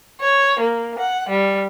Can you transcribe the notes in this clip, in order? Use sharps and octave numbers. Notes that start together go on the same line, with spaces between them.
C#5
A#3
F#5
G3